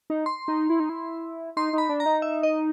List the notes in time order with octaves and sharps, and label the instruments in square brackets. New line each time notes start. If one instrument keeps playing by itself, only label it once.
[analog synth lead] D#4
[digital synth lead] C6
[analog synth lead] D#4
E4
D#4
E4
[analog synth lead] D#4 [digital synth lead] C6
[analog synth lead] D#4 [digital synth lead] B5
[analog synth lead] D4
[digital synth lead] A#5
[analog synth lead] D#4
[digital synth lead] E5
D#5